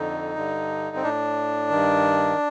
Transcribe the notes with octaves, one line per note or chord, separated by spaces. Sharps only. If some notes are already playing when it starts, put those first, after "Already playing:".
Already playing: F2 D3 D#4
G2 D3
C4
A2 D4
G2 D#3